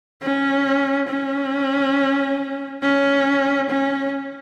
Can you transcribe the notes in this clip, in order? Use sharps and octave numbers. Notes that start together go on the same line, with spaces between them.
C#4
C#4
C#4
C#4